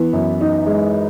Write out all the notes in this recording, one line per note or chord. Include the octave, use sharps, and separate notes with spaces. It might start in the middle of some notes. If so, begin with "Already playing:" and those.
Already playing: E3 B3
F#2
D#4
G#3